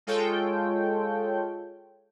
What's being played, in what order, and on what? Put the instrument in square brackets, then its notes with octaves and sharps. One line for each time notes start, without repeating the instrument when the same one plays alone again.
[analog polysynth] G#3 F4 A4 C#5 G5